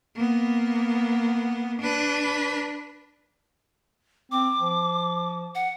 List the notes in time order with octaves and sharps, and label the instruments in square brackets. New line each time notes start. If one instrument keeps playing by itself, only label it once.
[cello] A#3 B3
D4 B4
[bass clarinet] C4 [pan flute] D6
[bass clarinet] F3
[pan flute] F#5